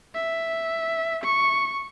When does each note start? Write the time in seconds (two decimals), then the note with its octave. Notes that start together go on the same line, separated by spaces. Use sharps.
0.15 E5
1.24 C#6